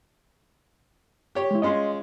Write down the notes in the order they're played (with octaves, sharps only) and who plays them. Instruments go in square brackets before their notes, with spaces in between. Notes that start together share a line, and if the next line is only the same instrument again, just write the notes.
[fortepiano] G4 C#5
[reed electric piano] G#3 E4
[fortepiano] G#3 C#4 F4 [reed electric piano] D#5 C6